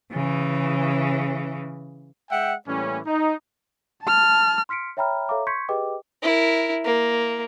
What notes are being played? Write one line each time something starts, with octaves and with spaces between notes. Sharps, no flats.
C#3 E3
G#3 E5 F#5 G5
A2 E3 G3 A#3 C#4
D#4
A5 F6
C6 F6 B6 C#7 D7
C#5 E5 G5 A#5 B5 F6
A4 C#5 E5 F5 A#5 D6
C6 C#6 G6 G#6 B6 C#7
G4 G#4 B4 D#5 G5 D6
E4 A#4
A#3